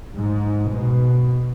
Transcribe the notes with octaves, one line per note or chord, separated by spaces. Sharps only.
G#2
B2